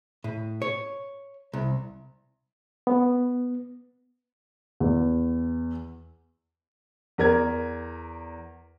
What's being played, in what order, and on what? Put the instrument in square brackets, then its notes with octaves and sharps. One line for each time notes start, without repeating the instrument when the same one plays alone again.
[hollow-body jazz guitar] A2
C#5
C2
[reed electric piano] B3
[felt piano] E2
[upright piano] E2 A#4 G#6